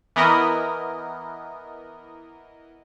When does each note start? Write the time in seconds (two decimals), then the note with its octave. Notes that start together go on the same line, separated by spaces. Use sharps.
0.16 E3 B3 A#4 D#5